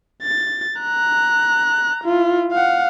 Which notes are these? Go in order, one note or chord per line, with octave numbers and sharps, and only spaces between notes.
A6
A#5 F#6
E4 F4
F5 F#5